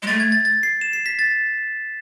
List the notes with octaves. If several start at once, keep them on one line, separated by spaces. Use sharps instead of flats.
G#3
A3 A6
G#6
A6
A6
C7
E7
C7
B6
A6